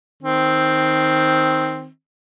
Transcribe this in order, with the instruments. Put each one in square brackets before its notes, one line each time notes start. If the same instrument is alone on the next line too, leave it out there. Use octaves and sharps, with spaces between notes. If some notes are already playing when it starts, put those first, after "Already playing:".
[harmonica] D#3 C4